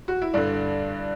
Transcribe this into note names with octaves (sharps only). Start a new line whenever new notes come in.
F#4
E4
G2 D3 D4